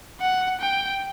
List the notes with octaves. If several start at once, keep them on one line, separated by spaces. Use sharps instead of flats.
F#5
G5